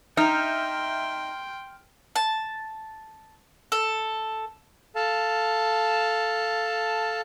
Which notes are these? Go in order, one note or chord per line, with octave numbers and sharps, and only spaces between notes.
D#4 E5 G5 C6 F6 G6
A5
A4
A4 F5 A5